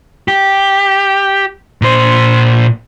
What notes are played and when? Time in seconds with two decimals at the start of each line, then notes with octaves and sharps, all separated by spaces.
0.28 G4
1.82 A#2 C5